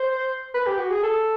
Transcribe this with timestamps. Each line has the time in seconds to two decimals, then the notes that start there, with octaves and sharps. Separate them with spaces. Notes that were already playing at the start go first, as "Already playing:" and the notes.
Already playing: C5
0.54 B4
0.67 G4
0.78 F#4
0.91 G#4
1.03 A4